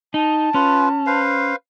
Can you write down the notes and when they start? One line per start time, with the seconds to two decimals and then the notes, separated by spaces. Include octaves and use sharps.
0.14 D#4 A5
0.54 C#4 F4 B4
1.06 B4 C5 F5